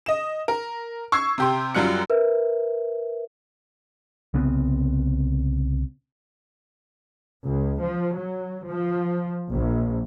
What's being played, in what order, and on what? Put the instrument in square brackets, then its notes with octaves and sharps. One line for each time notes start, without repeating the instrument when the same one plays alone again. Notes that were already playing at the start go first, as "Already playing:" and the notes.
[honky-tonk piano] D#5 E7
A#4
C#6 E6 G#6 C7
C3 G4 C6
F#2 F#3 G3 F4 F#6 C#7
[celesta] A#4 B4 E5
[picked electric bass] C2 C#3 B3 C4
[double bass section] C#2
F3
F#3
F3
A#1